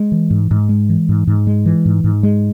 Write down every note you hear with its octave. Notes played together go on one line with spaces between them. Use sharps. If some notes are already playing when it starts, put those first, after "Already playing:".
Already playing: G#3
E3
G#2
G#2
G#3
E3
G#2
G#2
G#3
E3
G#2
G#2
G#3